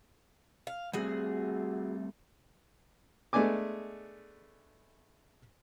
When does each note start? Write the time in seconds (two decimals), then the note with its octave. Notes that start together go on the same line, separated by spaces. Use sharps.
0.67 F5
0.93 G3 A3 C4 F#4 G#4
3.33 G#3 A3 B3 D4 G#5 D6